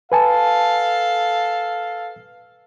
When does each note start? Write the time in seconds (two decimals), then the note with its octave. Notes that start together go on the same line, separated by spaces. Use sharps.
0.12 A4 B4 F5 G#5 A5